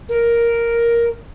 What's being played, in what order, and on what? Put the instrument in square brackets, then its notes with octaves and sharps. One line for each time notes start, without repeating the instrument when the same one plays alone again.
[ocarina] A#4